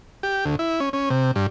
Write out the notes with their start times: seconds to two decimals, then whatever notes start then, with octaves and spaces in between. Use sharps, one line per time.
0.23 G4
0.45 D2
0.59 E4
0.80 C#4
0.93 C#4
1.10 C3
1.36 G2